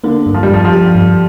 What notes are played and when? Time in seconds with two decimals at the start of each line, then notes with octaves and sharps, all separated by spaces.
0.04 D3 A#3
0.26 G2
0.34 F3
0.43 G3
0.49 G2 F3
0.65 F3
0.73 G4
0.95 G2